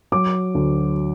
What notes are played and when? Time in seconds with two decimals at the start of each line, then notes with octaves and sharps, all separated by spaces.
0.12 F#3 D6
0.55 D2